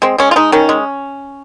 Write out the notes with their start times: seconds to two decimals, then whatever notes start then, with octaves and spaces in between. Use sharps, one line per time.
0.02 G#3 C4
0.18 G#3 C#4
0.31 F4
0.36 G#3 D#4
0.52 D#3 C#4
0.69 G#3